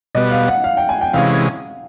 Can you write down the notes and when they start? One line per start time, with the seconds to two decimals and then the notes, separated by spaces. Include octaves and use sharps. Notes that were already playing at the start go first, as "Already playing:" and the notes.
0.15 B2 G3 B3 D#5
0.31 F5
0.47 F#5
0.64 F5
0.77 G5
0.89 G#5
1.01 G5
1.13 C3 E3 G#3 C#4 F5